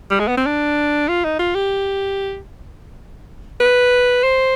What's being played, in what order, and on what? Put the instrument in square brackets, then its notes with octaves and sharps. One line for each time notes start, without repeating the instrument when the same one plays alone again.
[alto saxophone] G3
G#3
B3
C4
D4
F4
D#4
F4
G4
B4
C5